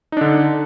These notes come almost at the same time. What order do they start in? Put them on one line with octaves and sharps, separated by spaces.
D#4 D4 D3